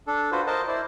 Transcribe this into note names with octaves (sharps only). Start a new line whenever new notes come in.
D4 A4
F4 F#4 B4 C5
A#4 C5 D#5 A5
E4 C5 D5